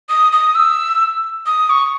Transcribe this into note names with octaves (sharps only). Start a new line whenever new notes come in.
D#6
D#6
E6
D#6
C#6